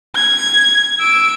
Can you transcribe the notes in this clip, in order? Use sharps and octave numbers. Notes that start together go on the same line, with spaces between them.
G#6
E6 D7